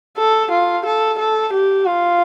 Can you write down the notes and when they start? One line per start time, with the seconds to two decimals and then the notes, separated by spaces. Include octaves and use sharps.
0.18 A4
0.51 F4
0.86 A4
1.18 A4
1.53 G4
1.86 F4